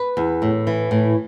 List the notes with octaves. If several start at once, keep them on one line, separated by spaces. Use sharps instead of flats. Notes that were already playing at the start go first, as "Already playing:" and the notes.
Already playing: B4
E2
A2
E3
A2